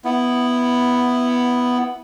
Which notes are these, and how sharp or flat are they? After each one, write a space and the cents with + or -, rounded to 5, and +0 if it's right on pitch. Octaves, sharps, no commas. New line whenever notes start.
B3 +0 E4 +0